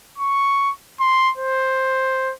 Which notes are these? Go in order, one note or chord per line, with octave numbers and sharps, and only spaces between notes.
C#6
C6
C5